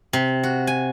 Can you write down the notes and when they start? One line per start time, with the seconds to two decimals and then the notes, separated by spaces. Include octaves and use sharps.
0.13 C3
0.43 F#4
0.67 G#5